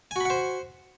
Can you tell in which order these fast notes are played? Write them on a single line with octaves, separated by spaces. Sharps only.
G#5 F#4 B5 F#5 C5